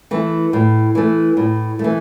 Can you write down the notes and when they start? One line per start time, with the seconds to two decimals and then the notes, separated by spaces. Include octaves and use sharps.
0.11 E3 A3
0.53 A2
0.95 E3 A3
1.37 A2
1.79 A3
1.84 E3